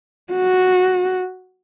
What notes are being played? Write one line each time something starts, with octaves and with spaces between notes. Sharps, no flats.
F#4